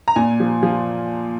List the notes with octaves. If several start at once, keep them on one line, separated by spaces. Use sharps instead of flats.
A#5
A#2 G#5
F3
F3